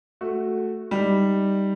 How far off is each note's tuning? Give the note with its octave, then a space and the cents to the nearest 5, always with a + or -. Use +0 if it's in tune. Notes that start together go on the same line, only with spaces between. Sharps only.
A3 +0 F#4 +0
G3 +0 D#4 +5